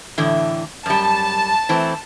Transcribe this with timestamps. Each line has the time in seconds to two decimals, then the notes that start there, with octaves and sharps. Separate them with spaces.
0.18 A2 D3 E3
0.86 F#2 G3 A5
1.69 E3 A3 C4